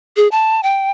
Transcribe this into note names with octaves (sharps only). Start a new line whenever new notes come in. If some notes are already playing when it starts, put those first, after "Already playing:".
G#4
A5
G5